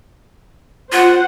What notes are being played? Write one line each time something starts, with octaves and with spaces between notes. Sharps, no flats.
F4 C5 F#5